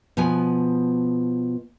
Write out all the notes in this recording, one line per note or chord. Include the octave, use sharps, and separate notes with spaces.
B2 F3 B3 G#5